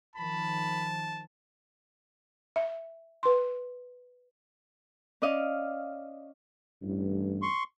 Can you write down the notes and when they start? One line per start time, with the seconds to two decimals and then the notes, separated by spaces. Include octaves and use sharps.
0.15 D#3 F3 A5 B5
2.56 E5
3.23 B4 C6
5.22 C#4 D5 D#5 F5
6.82 A1 G2
7.42 C6 C#6